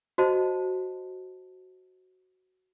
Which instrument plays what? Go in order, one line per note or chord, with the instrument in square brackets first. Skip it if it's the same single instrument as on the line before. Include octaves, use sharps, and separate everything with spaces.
[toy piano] F#4 C5 D#5 A5